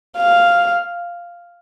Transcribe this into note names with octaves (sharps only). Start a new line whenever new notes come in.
F5